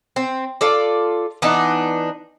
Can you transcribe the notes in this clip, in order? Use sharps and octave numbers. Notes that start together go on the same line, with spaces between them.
C4
F4 A4 D5
E3 B3 D4 D#4